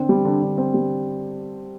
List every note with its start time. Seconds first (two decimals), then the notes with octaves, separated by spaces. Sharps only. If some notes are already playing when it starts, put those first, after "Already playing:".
Already playing: D3 C4
0.09 G3
0.25 D3
0.42 D3
0.58 C4
0.74 G3